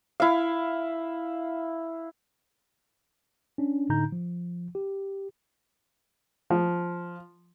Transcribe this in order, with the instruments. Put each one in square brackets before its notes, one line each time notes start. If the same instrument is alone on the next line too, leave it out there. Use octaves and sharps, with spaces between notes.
[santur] E4 F5
[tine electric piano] C#4 D4
A2 D3 D#4 A#5 G6
F3
G4
[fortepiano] F3